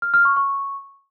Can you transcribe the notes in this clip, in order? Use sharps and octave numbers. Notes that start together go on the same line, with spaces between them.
F6
F6
C#6
C#6